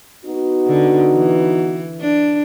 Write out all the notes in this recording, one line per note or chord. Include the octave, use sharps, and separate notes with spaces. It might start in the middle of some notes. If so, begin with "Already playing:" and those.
B3 D#4 F#4
D3
E3
D4